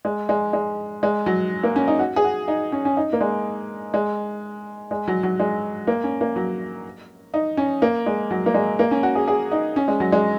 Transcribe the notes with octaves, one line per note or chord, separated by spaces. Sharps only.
G#3
G#3
G#3
G#3
F#3
A#3
C#4
D#4
F#4
G#4
F#4
D#4
C#4
C#4
D#4
A#3
G#3
G#3
G#3
F#3
F#3
G#3
A#3
C#4
A#3
F#3
D#4
C#4
A#3
G#3
F#3
A#3
G#3
A#3
C#4
F#4
G#4
G#4
D#4
C#4
G#3
F#3
G#3